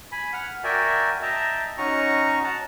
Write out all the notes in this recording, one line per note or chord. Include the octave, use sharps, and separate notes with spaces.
G#5 B5
F#5 F6
F#4 A#4 D5 E5 G5 G#5
D#5 E5 G5 A5 A#5
C#4 D#4 F#4 A#5 C#6
F#5 A5 A#5